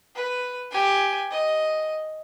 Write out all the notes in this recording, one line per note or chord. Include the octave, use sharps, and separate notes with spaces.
B4
G4 G#5
D#5